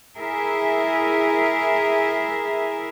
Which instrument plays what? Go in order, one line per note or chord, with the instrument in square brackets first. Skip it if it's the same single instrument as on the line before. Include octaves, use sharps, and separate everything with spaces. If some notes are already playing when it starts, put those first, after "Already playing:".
[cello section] E4 G#4 A#4 E5